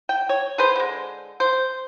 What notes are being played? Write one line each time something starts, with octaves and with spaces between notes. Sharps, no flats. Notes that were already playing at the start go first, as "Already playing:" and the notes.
G5
C#5
G#4 B4 C5
D3 G#3
C5